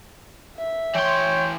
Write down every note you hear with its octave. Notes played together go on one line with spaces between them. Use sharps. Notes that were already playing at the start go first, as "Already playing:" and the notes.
E5
E3 C#5 G5 C6